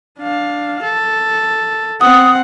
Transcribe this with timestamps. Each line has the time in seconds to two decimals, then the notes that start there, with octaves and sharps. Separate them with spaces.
0.19 D4 F5
0.82 A4
2.01 C4 F#5 D#6